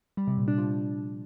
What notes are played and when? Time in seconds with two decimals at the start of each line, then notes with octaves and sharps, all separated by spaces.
0.17 G3
0.27 C3
0.38 A#2
0.48 D4
0.58 F3